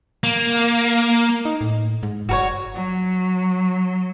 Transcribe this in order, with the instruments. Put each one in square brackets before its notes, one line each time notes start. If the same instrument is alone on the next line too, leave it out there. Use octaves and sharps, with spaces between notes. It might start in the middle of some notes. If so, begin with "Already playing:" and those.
[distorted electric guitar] A#3
[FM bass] D#4
A2
G#2
[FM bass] F#1 [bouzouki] F#4 A#4 C#5
[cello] F#3